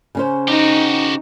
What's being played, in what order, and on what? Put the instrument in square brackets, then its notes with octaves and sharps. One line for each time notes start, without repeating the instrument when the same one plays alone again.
[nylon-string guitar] C#3 C#4 C5
[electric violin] D#4 [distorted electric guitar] F#4 G4